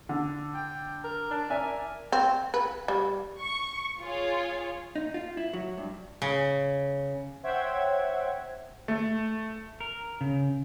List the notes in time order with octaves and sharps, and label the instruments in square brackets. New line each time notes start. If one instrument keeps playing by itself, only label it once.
[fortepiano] D3
[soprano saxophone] G5
A#4
D4
[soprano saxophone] A#4 [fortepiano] D5 E5 G#5
[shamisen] C4
B4
G3
[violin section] C#6
F4 G#4 C#5
[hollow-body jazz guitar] D#4
F4
E4
F#3
G2
[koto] C#3
[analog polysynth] C5 C#5 E5 F#5 G5 G#6
[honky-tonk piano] A3
[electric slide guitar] A#4
C#3